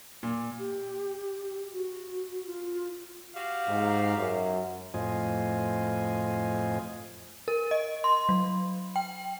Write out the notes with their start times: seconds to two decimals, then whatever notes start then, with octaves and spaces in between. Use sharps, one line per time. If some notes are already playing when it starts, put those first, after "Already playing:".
0.23 A#2
0.58 G4
1.73 F#4
2.46 F4
3.35 F#4 G4 F5
3.68 G#2
4.18 F#2
4.94 F2 A2 F4 C5 D#5 G#5
7.48 A#4
7.71 D#5
8.04 C6
8.29 F#3
8.96 G5